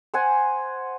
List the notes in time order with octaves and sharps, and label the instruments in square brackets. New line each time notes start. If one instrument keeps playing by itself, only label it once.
[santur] C5 F#5 G#5